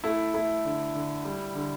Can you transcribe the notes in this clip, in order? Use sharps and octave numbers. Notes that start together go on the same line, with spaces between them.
A3 E4
A3 E4
D3
D3
G3
D3